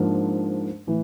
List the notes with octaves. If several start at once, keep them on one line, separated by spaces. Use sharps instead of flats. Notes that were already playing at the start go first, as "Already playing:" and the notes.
Already playing: G#2 F3 A#3 D4
A2 E3